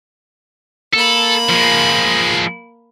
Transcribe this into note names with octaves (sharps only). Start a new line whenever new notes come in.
A#3 A4 B5
F3 G#3